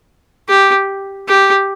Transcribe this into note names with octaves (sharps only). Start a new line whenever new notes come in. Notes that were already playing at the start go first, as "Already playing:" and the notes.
G4
G4